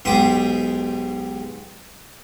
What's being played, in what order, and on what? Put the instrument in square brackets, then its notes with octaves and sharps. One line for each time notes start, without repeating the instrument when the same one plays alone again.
[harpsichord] B1 G#2 G4 B5 C6 D#6